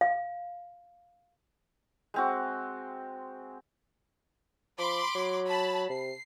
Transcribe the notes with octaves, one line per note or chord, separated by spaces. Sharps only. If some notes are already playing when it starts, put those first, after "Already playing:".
F5
G#3 C4 F#4
F3 B5 C6 D6
F#3
A5 B5
C3 C7